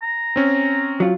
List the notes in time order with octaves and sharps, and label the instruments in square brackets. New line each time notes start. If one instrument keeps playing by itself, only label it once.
[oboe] A#5
[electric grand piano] C4 C#4
[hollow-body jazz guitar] F#3 F4